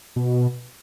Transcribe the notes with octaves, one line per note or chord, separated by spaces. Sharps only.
B2